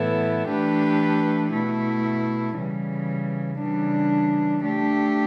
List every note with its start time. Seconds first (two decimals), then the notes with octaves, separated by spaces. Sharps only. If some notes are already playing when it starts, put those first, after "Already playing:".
Already playing: A2 E3 B3 E4 A4
0.50 E3 A3 D4 G4 B4
1.53 B2 A3 E4
2.56 C#3 E3 G3
3.60 C#3 E3 G3 D4
4.63 A3 D4 G4